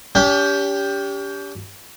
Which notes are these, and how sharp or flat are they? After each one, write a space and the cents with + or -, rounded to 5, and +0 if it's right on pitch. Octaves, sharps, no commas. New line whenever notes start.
C#4 +45 G4 +10